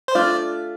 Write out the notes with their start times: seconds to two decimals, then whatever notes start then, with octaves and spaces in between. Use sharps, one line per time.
0.08 C5
0.15 A3 D4 F4 D5